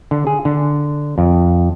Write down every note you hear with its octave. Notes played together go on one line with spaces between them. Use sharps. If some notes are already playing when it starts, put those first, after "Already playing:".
D3
G#4
D3
F2